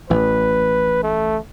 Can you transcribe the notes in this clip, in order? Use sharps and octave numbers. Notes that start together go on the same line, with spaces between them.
A1 E3 B4
A3